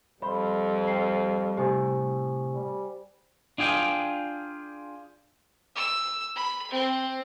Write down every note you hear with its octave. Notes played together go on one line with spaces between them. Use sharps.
F2 G3 C5 B5
G5 C7
A2 C3 G4 C5 G#5
G3
D4 F4 G#4 G5
E6
B5
C4